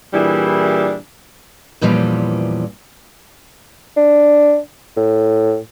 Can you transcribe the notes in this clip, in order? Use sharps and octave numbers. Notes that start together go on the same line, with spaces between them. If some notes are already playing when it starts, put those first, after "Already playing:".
A#2 E3 G3 D4 E4 G#4
E2 A#2 E3 F3 G3 C#4
D4
A2